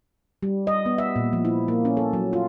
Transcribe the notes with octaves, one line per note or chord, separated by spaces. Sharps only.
G3
D#5
B3
E5
A#2
F3
E4
A#3
C#4
A4
F#3
F4